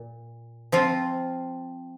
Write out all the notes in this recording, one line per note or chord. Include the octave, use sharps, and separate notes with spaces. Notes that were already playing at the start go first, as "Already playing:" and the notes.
Already playing: A#2
F3 C4 F4